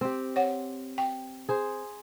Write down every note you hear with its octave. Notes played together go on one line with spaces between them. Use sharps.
C4 G4
C#5 F#5
G5
G#4 C5